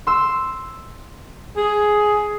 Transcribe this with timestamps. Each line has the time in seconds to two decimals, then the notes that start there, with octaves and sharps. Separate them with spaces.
0.07 C6 E6
1.57 G#4